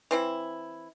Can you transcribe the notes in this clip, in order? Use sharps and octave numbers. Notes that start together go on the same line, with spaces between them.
E3 C4 E4